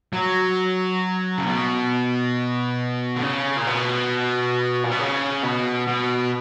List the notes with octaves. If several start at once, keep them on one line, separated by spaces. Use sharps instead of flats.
F#3
C#3
B2
D3
C#3
A#2
B2
A#2
B2
C#3
B2
B2